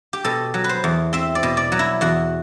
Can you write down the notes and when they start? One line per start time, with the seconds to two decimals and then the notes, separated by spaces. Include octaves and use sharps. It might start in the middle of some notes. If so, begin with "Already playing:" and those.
0.13 G4
0.24 B2 A4
0.54 F#3
0.64 B4
0.69 C5
0.84 E2
1.13 C4 E5
1.35 D5
1.43 B2
1.57 D5
1.72 F#3
1.79 E4
2.01 E2 F#4